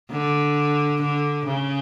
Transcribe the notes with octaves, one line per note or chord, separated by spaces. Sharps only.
D3
D3
C#3